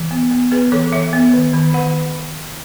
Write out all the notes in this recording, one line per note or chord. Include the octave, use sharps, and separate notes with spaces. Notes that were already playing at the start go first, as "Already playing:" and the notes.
Already playing: E3
B3
B3
B3 G#4 B4
E3 A4 C#5
E3 C#5 E5
B3
D#3
D#3
D#3 F#5